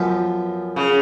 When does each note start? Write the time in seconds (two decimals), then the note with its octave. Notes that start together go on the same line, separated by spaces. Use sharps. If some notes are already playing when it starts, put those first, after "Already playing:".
Already playing: F#2 F3 B3
0.76 C#3